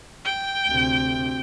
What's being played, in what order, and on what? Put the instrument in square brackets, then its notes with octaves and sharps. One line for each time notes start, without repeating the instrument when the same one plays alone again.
[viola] G5
[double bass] D2 C3